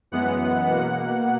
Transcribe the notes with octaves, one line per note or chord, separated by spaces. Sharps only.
F#2 E3 G#3 B3 F#5
B2 A#3 F#5